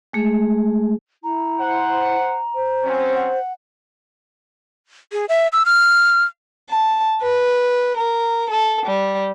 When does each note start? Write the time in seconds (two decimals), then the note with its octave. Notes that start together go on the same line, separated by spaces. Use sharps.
0.13 G#3 A3 G#4
1.23 E4 A#5
1.60 C5 F#5
2.55 C5
2.84 F#3 C4 C#4
3.15 F#5
5.12 G#4
5.29 E5
5.53 E6
5.66 F6
6.69 A5
7.21 B4
7.97 A#4
8.52 A4
8.85 G3